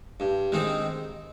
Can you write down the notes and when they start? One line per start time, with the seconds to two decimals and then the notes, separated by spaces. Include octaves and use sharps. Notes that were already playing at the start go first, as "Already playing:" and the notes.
0.20 G2
0.52 D#3 G#3 C4 D#4